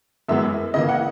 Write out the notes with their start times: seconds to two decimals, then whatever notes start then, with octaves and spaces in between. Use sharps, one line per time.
0.29 F#2 E3 G#3 B3 E5
0.74 C#3 E3 A#3 D#5
0.89 F#5